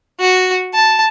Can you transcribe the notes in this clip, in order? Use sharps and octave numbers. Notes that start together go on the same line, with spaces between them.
F#4
A5